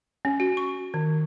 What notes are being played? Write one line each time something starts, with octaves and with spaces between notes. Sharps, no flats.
C#4
F#4
C#6
D#3